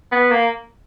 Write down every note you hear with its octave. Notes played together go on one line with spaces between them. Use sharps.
B3
A#3